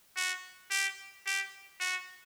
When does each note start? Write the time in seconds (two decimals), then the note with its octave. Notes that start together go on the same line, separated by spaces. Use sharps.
0.16 F#4
0.71 G4
1.26 G4
1.80 F#4